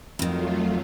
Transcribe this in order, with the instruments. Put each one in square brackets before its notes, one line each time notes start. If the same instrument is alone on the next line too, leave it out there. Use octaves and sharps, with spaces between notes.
[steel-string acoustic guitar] F2 D#3 [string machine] F#3 A3 F4